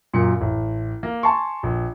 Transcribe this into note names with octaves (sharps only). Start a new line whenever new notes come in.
F#2 A#2 C#7
A1
A#3
G#5 A5 C6 C#6
A#1